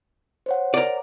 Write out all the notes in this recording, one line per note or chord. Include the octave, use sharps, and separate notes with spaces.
C5 C#5 F#5
A#4 D5